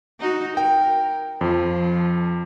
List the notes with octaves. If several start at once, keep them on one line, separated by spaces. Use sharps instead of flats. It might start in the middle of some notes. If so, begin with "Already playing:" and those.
D#4 F#4
A#4 G5
F2 F3